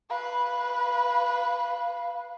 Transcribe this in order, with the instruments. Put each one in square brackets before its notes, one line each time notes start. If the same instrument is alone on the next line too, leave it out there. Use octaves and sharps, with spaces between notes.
[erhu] B4 [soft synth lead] F5